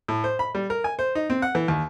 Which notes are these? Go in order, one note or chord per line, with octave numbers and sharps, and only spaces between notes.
A2
C5
B5
G3
A#4
G#5
C5
D#4
C4
F#5
E3
D#2